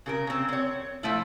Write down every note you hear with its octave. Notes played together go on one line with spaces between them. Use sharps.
C#3 A4 A#4
C#3 C4
C4 C#5
F3 A3 E4